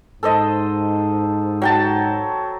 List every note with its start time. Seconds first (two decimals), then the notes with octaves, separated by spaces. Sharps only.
0.23 G#2 A4 C5 D#5
1.62 F#3 G5 A5